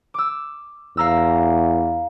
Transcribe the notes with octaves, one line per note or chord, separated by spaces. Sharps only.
D6 E6
E2 F5 A#5 E6